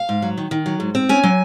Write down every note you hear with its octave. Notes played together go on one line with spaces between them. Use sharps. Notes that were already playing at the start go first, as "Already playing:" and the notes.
Already playing: F5
G#2
F#3
D#3
D#3
F#3
G#2
C4
C#4 G#5
F#3